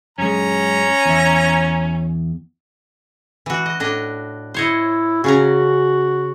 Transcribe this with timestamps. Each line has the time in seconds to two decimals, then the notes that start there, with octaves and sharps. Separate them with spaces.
0.18 F#2 G#3 C#4 A#5
1.06 E2 E5
3.46 E3 F#4
3.66 D#5
3.80 A2 D4 D#5
4.54 E4 C5 C#5 D#5
5.24 C#3 C#4 F#4 A#5